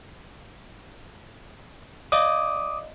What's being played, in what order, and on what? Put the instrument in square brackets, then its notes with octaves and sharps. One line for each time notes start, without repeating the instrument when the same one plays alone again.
[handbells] D5 D#5 F5 [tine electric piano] D6 D#6